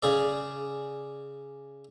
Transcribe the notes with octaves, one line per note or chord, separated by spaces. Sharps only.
C#3 G#4 D5